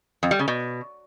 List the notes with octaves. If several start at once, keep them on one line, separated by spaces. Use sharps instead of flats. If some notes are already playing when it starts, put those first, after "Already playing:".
F2
G3
C#3
B2